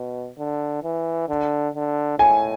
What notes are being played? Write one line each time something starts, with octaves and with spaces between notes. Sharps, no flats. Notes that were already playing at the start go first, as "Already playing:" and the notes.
Already playing: B2
D3
E3
D3
D3
A2 G#5